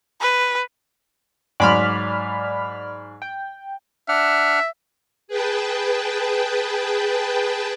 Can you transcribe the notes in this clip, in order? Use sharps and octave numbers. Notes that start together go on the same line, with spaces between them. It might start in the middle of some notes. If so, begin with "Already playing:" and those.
B4
G#2 F#3 D5 B5 C6 F6
G5
D4 E5 F#5 F6
G#4 B4 G5 A5